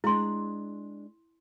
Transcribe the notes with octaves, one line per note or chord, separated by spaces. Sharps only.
G#3 D4 E4 C6